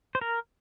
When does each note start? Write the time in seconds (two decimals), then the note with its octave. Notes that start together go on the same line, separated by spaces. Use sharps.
0.15 C5
0.21 A#4